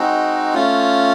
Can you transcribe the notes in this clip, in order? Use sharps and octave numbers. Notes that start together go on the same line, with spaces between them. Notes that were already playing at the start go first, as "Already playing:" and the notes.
Already playing: G#3 C4 D#4 F#4
A3 C#4 F4